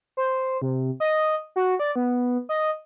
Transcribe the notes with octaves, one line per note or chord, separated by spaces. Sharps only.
C5
C3
D#5
F#4
D5
B3
D#5